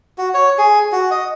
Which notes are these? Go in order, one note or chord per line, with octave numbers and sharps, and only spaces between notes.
F#4
C#5
G#4
F#4
D#5